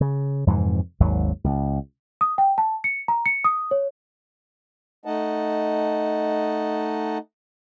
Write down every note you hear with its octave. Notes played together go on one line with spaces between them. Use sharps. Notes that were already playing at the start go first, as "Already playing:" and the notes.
C#3
F2 G#2 C3 E3
G#1 D#2 G#2 F#3
C#2
D#6
G5
A5
C#7
A#5
C#7
D#6
C#5
A3 D#4 D#5 F#5 A5